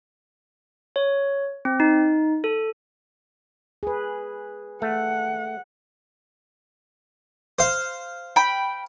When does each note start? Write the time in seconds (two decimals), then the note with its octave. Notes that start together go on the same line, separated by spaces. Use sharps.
0.96 C#5
1.65 C4
1.80 D#4
2.44 A4
3.83 G#4 B4
4.82 A3 F#5
7.59 C5 F5
8.36 G5 B5